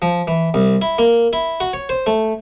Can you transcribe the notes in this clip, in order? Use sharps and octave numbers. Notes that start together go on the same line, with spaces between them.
F3
E3
C2
E4
A#3
E4
F#4
C#5
C5
A3